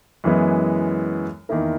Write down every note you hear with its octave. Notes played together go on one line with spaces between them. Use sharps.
F#2 E3 G#3 B3 E4
E2 D#3 A#3 E4 A#4